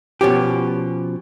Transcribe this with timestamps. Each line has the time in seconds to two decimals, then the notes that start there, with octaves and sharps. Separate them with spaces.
0.21 B2 F3 C#4 G4